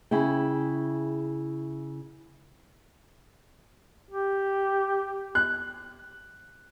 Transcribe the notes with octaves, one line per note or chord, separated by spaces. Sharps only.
C#3 E4 G#4 G5
G4
F#6